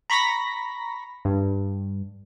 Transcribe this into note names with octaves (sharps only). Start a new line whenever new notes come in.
A#5 B5 C#6 A#6 B6
G2